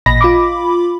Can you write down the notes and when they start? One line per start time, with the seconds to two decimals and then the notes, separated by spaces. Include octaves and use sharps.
0.06 A1 A#2 D#5 B5 A#6
0.21 F4 B5 D6